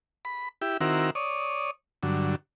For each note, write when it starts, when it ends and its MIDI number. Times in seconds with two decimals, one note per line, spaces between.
0.25 0.49 83
0.62 0.77 64
0.62 0.77 67
0.81 1.10 51
0.81 1.10 60
0.81 1.10 64
0.81 1.10 66
0.81 1.10 70
1.15 1.71 73
1.15 1.71 74
1.15 1.71 87
2.03 2.36 43
2.03 2.36 50
2.03 2.36 54